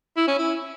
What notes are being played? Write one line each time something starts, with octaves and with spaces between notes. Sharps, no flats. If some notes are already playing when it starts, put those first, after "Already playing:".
E4
C#4
E4